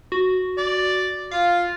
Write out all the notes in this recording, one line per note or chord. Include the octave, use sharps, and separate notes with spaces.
F#4
D5
F4 F5